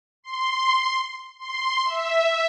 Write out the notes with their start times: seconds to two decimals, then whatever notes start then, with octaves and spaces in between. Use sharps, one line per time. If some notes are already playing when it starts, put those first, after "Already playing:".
0.23 C6
1.38 C6
1.84 E5